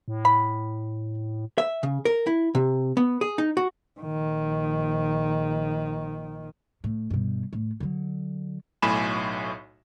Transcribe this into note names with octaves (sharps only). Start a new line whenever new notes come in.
A2
B5
E5
C#3
A#4
E4
C3
B3
G#4
D#4
F#4
A#1 D#3
A2
G2 B2
A2
D3 F#3
B1 A2 G#5 B5 E7